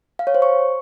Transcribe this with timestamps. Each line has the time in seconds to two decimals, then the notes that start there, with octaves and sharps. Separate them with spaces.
0.19 F5
0.27 C#5
0.35 C5
0.42 C#6